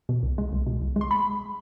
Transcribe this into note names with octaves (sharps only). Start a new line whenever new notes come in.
B2
C2
G#3
C2
B2
C2
G#3
C6
B5